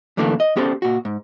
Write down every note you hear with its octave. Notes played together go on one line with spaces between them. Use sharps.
F#2 D3 E3 A3 A#3 D4
D#5
B3 C#4 G4 A4 C5 D5
A#2 F#4
G#2